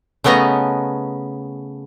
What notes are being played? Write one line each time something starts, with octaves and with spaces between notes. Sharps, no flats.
C#3 A3 B3 C#4 D#5 A#5